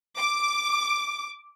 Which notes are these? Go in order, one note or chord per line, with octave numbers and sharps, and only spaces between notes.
D6